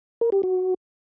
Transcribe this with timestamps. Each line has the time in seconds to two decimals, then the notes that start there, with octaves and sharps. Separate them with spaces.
0.21 A#4
0.32 G4
0.43 F#4